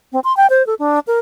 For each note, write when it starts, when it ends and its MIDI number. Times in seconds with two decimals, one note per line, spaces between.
0.12 0.20 60
0.24 0.35 84
0.37 0.47 79
0.50 0.65 72
0.67 0.74 69
0.79 0.99 62
1.07 1.20 70